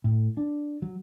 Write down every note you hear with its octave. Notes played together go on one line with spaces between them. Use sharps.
A2
D4
F#3